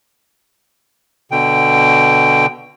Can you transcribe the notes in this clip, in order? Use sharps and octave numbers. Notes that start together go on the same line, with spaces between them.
B2 D3 G5